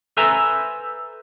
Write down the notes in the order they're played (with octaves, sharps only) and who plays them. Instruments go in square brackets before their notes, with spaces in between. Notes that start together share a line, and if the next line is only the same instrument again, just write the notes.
[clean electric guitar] A4 B4 C5 E5 G#5 A#5